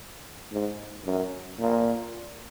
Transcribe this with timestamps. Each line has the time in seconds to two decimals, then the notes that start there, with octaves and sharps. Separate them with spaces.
0.52 G#2
1.06 F#2
1.59 A#2